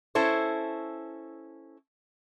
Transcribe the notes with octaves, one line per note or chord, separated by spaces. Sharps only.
C#4 E4 A4 C5